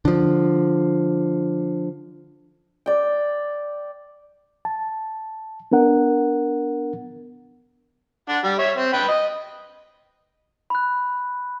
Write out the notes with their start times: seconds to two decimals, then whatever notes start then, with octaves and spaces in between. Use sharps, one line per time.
0.05 D3 F3
2.86 D5 G5
4.65 A5
5.72 B3 D4 A#4 F#5
8.29 D4 F#5
8.44 G3
8.59 C#5 E5
8.77 C4
8.93 B4 G5
9.08 D#5
10.70 B5 F#6